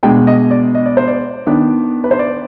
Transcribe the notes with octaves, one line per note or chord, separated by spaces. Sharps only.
B2 G#3 B3 D4 G5
D#5
D5
D#5
D5
C5
D5
D#3 B3 D4
B4
C5
D5